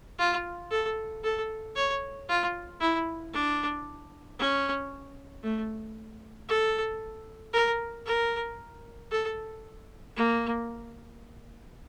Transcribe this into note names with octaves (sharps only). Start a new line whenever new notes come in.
F4
A4
A4
C#5
F4
E4
D4
C#4
A3
A4
A#4
A#4
A4
A#3